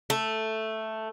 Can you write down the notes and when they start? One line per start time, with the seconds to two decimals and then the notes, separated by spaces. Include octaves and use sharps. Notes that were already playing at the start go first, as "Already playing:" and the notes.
0.10 A3